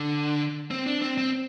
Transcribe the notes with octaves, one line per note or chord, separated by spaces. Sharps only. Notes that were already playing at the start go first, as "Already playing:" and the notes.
Already playing: D3
C4
D4
C4
C4